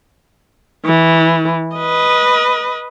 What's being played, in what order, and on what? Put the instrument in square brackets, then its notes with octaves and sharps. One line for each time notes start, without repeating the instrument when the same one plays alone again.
[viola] E3
B4 D#5